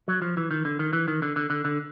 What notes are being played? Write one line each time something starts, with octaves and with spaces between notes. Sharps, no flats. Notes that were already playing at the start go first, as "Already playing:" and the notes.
F#3
F3
E3
D#3
D3
D#3
E3
D#3
D3
D3
D3
D3